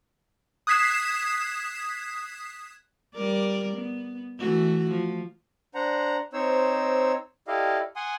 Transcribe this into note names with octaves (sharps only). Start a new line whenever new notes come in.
D#6 F#6 G#6 B6 C7 E7
G3 A#4 D5
B3
E3 A3 F#4
F3
D4 C5 F#5 A#5
C4 D#4 C5 C#5 E6
E4 G4 A4 D5 D#5 F5
F#5 G#5 C6 D#6